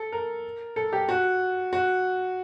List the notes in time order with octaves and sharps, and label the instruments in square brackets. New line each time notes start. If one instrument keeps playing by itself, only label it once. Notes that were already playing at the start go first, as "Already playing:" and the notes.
Already playing: [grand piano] A4
A#4
A4
G4
F#4
F#4